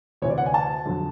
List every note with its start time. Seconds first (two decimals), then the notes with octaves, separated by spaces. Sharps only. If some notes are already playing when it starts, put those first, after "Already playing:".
0.22 D2 C3 E3 C#5
0.30 D5
0.38 F#5
0.46 G#5
0.54 A5
0.86 F2 D3 F#3